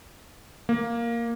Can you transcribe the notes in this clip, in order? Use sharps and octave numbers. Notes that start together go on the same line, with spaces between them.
A#3